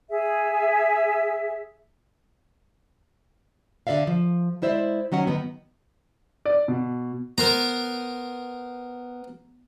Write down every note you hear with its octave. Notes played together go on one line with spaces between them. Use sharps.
G#4 E5
D3 A4 D5 E5 F5
F3
G#3 E4 C5 D5 E5
D#3 F#3 C#4 F#5
D#3 F#3 B3
D5
B2
B3 A#4 C5 A#5